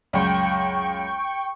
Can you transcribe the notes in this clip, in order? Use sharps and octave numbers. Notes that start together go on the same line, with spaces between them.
C#2 F#2 G5 C#6